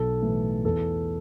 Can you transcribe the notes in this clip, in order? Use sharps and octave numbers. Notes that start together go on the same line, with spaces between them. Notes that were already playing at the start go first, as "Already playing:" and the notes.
Already playing: B1 A4
A2 E3
E2 A4